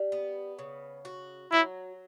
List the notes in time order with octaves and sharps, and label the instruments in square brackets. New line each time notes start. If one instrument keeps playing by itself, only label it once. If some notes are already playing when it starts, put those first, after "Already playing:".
Already playing: [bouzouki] G3
B3
C#3
F#4
[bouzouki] F#3 [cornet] E4